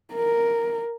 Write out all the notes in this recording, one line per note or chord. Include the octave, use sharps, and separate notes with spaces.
A#4